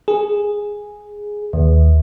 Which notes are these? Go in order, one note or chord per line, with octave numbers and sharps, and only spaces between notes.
G#4
D#2